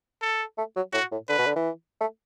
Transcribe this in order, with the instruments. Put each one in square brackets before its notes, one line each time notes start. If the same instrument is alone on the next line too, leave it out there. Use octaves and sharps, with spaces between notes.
[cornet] A4
[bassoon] A3
F#3
[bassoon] A2 [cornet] F#4
[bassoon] A2
[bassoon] D3 [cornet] B4
[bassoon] B2
D3
E3
A3